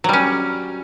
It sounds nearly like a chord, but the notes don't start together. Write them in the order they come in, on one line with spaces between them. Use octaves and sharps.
F#3 G3 C#4